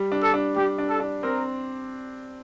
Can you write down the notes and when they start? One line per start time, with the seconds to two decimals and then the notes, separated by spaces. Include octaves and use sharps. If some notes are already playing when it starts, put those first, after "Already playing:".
Already playing: G3
0.12 D4
0.23 A4
0.34 D4
0.56 G3 G4
0.78 D4
0.89 A4
1.00 D4
1.23 C4 A#4